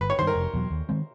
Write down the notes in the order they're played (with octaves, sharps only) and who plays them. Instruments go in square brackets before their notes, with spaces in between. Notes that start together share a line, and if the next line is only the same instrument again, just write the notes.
[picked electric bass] G1 [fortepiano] B4
[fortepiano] C#5
[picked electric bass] G2 D#3 [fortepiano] C5
[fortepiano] A#4
[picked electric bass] F1
E2 B2 F#3
D#2
D#3 G#3 C4